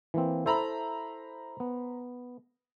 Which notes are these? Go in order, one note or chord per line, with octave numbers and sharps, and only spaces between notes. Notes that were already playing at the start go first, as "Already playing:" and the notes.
E3 A#3 C4
E4 A4 C5 E5 A#5 B5
B3